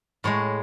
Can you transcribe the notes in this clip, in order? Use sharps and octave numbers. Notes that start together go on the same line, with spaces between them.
A2 G#3 C#5